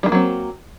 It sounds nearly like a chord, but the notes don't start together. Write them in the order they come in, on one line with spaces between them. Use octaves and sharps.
G3 D#3 A#3 F#3 C4